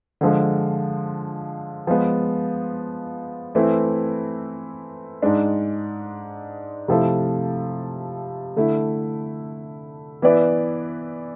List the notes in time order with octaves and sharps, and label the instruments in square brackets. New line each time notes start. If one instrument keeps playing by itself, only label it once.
[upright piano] D3 F3 G#3
F3 G#3 B3
E3 A3 C4 E4
G#2 G#3 D4
C3 F3 A3 E4 A4
D3 A3 E4
E3 B3 E4 B4 D5